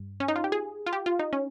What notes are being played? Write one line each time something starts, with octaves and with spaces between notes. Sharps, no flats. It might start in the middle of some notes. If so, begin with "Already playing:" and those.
Already playing: G2
C#4
D#4
F4
G4
G#4
F4
G4
F4
D#4
C#4